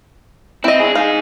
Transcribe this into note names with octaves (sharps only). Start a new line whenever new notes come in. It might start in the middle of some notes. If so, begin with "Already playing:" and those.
C4 E4 D#5
D4 G#4
D#4 G#4 F5